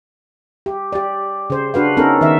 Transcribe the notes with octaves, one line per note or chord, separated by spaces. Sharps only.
G4
G4 D5
C#3 C5
D4 F#4 B4 F5
B3 C#4 D#4 A4 A#4
D#3 E5